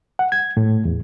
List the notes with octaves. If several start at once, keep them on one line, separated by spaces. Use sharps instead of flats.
F#5
G#6
A2
E2